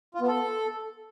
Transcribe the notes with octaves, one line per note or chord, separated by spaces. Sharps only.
F4
B3
A4